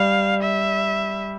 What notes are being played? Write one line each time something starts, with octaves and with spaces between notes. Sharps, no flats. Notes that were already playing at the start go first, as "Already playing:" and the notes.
Already playing: G3 F5
E5